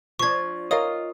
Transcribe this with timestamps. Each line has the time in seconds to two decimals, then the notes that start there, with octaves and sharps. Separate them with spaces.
0.19 F3 D4 C#6 G#6
0.71 F4 A#4 C#5 D#5 F5 D#6